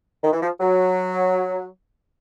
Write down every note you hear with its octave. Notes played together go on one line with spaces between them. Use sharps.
D#3
E3
F3
F#3